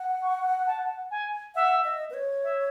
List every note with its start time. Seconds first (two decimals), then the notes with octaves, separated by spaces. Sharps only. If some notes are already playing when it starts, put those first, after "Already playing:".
Already playing: F#5
0.22 C#6
0.67 A5
1.11 G#5
1.55 E5 F#5
1.84 D#5
2.10 B4
2.14 C#5
2.44 E5